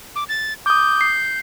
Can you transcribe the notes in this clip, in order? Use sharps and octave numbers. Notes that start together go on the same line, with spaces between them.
D6
A6
D6 D#6 G6
C7